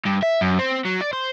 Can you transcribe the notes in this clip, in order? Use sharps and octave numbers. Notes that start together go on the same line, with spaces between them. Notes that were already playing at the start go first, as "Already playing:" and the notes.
G2
E5
F#2
C4
F#3
D5
C5